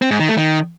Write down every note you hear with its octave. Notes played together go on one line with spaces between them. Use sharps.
C4
G#2
D#3
A3
D#3